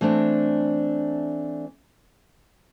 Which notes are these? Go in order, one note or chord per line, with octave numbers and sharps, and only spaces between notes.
E3 A3 C4 D4